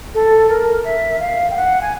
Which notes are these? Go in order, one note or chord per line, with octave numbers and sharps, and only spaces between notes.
A4
A#4
E5
F5
G5
F#5
G#5